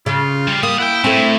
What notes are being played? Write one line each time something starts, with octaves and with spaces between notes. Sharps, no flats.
C#3 F4
G3
A#3 D#6
E4 F#5 G5
A2 A3 C4